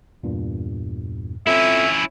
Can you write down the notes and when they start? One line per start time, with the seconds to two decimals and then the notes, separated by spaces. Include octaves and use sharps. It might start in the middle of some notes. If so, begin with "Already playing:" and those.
0.23 E2 G2 A#2
1.47 C4 C#4 E4 F4 A4 E5